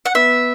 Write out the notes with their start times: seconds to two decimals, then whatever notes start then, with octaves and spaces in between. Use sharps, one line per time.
0.05 F#5
0.15 B3 E5